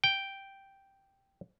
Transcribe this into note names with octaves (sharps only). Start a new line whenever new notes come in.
G5